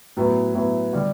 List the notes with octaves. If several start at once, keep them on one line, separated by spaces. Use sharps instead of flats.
A2 F#3 B3 E4
A2 F#3 B3 E4
D3 G3